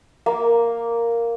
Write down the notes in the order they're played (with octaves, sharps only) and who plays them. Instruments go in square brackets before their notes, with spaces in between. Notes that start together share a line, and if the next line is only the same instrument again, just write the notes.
[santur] A#3